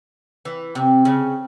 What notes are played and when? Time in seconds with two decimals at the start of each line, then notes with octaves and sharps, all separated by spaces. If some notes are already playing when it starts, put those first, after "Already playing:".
0.45 E3
0.75 C3
1.05 C#3